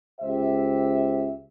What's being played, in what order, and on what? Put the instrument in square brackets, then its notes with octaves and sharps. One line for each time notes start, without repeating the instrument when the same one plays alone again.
[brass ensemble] C#2 G4 C5 E5